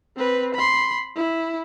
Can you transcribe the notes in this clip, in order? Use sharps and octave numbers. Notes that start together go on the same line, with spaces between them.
C4 B4
B5 C6
E4